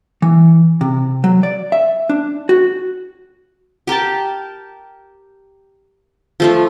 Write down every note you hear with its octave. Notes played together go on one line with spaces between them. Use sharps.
E3
C3
F#3
D5
E5
D4
F#4
G4 A#4 G5 A5
F3 A3 F4